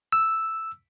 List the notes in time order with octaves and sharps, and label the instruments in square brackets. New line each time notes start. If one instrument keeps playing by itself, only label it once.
[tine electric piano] E6